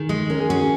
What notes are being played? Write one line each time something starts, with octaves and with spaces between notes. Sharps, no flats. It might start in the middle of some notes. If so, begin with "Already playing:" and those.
Already playing: D#3 G#4
G#3
C#4 A#4
G#4
C#4 F#4
G#4